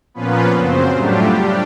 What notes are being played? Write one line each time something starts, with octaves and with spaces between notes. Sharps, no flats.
A#2 F3 A#3 B3 C#4 F4 B4
F#2 C#3 F#3 C4 C5
A2 F#3 G3 A3 D4 F4 G4
D4